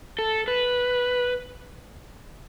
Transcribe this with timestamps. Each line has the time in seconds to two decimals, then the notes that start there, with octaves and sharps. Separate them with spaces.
0.19 A4
0.48 B4